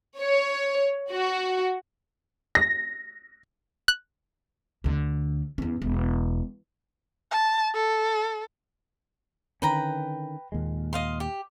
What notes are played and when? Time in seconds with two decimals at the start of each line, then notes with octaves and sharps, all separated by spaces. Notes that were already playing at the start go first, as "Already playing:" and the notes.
0.20 C#5
1.10 F#4
2.55 A#6
3.88 F#6
4.84 D2 D3
5.58 E2 C#4
5.82 E1
7.31 A5
7.74 A4
9.62 D3 D#3 C#4 B4 G5 A#5
10.52 D#2 A#2 G#3
10.93 D#5 F5 C6
11.20 G4